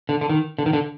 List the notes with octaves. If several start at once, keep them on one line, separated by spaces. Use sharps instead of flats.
D3
D3
D#3
D3
D#3
D3